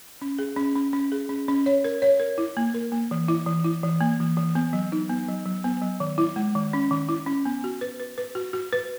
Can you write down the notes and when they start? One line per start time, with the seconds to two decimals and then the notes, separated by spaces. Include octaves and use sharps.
0.22 C#4
0.39 G#4
0.57 C#4
0.76 C#4
0.93 C#4
1.12 G#4
1.29 C#4
1.48 C#4
1.66 C#5
1.84 A#4
2.02 C#5
2.20 A#4
2.38 E4
2.57 A#3
2.74 A#4
2.92 A#3
3.11 E3
3.28 E4
3.46 E3
3.65 E4
3.83 E3
4.01 A#3
4.20 E3
4.37 E3
4.55 B3
4.73 F#3
4.92 D#4
5.09 B3
5.28 F#3
5.46 F#3
5.64 B3
5.82 F#3
6.00 D#3
6.18 E4
6.36 G#3
6.55 D#3
6.73 C#4
6.91 D#3
7.09 E4
7.27 C#4
7.45 B3
7.64 F#4
7.81 B4
8.00 B4
8.18 B4
8.35 F#4
8.53 F#4
8.73 B4